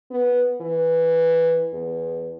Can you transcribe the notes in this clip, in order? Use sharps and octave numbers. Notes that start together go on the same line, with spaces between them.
B3
E3
E2